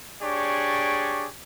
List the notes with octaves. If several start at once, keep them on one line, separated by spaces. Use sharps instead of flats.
D4 G4 G#4 C#5 D5 C#6